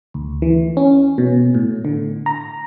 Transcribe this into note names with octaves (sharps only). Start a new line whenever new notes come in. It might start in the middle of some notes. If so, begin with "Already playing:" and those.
D2
E3
C#4
B2
A2
D3
A#5